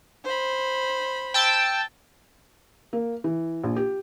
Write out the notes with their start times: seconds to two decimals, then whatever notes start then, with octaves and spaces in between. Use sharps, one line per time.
0.24 C5 B5
1.34 G5 A5 E6
2.93 A#3
3.24 E3
3.63 A#1
3.76 G4